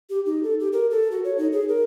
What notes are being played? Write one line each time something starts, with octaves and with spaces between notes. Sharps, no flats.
G4
D#4
A4
G4
A#4
A4
F#4
C#5
D#4
G#4
A#4